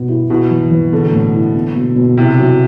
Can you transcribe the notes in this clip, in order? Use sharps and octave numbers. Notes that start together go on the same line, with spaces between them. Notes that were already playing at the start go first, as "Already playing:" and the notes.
Already playing: B2 B3
E4
B2 E4
E3
E3
D3 B3
A2
E4
B3
B2
B2
C3 E4
F#3